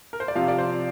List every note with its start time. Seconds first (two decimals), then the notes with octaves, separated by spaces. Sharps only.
0.13 A#4
0.20 C5
0.28 D5
0.35 C3 F3 C4 F5
0.48 D5
0.58 C5